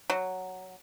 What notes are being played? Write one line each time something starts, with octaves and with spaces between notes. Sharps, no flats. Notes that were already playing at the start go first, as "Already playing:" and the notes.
F#3